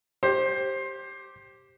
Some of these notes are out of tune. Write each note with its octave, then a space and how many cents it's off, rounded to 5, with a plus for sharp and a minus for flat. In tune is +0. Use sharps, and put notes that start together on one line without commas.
G4 -5 C5 +20